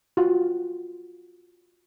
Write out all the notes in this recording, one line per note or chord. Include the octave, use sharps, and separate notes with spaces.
F4 F#4